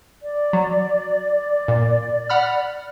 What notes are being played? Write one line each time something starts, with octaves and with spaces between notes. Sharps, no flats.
D5
F#3
A#2
F#5 B5 F6